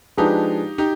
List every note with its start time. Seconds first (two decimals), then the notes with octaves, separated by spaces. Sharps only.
0.17 F3 G#3 D4 D#4 G4 G#4 B4
0.78 D#4 G4